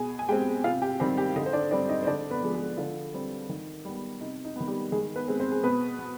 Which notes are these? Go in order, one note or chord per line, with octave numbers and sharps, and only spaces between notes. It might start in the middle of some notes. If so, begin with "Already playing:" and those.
Already playing: B2 G#4 G#5
G#5
G#3 C4 G4 G5
C3 F4 F5
G4 G5
D#3 G3 C4 G4 G5
G4 G5
D3 D#4 D#5
C5
D4 D5
G3 C4 D4 D5
D#4 D#5
C5
D3 D4 D5
B3 B4
F3 G#3
G#3 G#4
D3 F3 F4
G3 C4
D#3
G3 B3
C3 D#4
D#4
D#3 B3
G3 G4
D#3 G#3 G#4
B3 B4
G#3 C4
C4 C5
G#4
B2 B3 B4
B3